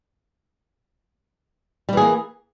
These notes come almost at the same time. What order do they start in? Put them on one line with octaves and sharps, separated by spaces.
G3 E3 G#4 A#3